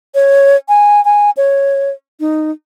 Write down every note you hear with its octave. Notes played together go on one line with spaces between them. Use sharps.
C#5
G#5
G#5
C#5
D#4